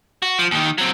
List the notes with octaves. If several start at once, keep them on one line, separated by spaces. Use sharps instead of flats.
F#4
F3
D#2 D#3
F#3 C4